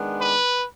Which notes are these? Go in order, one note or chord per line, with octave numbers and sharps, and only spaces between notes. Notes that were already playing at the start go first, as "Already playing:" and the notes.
Already playing: D#3 G#3 B3 D4
B4